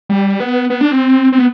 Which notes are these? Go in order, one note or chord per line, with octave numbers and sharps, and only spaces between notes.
G3
B3
B3
D4
C4
C4
B3